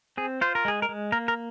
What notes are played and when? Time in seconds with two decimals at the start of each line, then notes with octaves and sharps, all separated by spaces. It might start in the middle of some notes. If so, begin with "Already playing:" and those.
0.17 C4 G#4
0.41 F4 C5
0.55 A#4
0.65 G#3 G#4
0.82 A#4
0.89 G#3
1.12 A#3 A#4
1.28 A#4